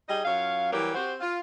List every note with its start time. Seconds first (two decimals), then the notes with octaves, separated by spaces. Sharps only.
0.09 G3 D#4 G#4 D#5
0.24 F#2 F4 C#5 F5
0.73 E3 F#3 G3 G4 A#4
0.94 C4 F#4 G4 C5
1.21 F4